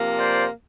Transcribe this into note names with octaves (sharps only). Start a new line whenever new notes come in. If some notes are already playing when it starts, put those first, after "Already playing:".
Already playing: C3 F3 A#3
C5 D5